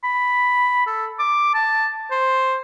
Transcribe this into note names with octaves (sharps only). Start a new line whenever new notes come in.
B5
A4
D6
A5
C5